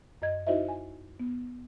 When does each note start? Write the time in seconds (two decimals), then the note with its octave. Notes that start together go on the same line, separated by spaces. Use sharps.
0.22 F#2 D#5 G#6
0.47 D#4 E4 F#4 C5 D#5 E5
0.68 G#5
1.20 B3